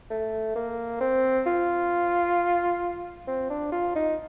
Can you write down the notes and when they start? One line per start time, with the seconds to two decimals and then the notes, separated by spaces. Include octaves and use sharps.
0.10 A3
0.55 A#3
1.01 C4
1.46 F4
3.28 C4
3.50 D4
3.72 F4
3.95 D#4